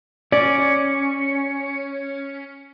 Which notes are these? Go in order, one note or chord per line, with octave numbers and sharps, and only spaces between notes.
C#4 D5